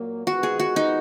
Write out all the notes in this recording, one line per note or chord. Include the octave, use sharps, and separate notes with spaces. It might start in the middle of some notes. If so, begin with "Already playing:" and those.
Already playing: A#2 F#3 A#3
D#3 G#3 B3 F4 F#4 B4
G#4
F#4
D#4